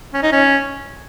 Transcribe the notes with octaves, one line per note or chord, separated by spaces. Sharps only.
C#4
D#4
C#4